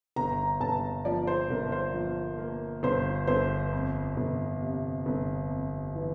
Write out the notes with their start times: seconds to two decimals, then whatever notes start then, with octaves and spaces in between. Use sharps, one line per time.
0.16 G1 A#5
0.61 G1 A5
1.05 F3 D5
1.27 C5
1.50 G1 A#4
1.72 C5
1.94 F3
2.39 A#3
2.83 G1 C5
3.27 G1 C5
3.72 F2
4.17 G1
4.62 C3
5.06 G1
5.50 F2
5.95 E3